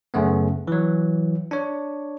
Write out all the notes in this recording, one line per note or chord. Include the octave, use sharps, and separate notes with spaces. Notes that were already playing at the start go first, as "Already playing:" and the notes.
F#2 C#3 A3 B3
E3 F#3
D4 C#5